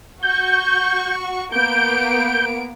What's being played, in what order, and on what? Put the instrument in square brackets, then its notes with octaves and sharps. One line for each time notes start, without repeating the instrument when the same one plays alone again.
[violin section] F#4 C#6 [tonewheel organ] G6
[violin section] A#3 B3 D7 [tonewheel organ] G6